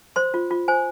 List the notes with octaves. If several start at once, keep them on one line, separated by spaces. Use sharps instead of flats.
C5 C6
F4
F4
C5 G#5